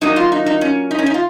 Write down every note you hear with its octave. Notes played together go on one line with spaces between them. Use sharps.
A#2 F#3 A#3 D#4
F4
D#4
D#4
C#4
D#4
C#4
D#4
F4